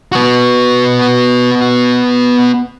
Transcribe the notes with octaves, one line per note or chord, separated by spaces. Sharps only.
B3 F#4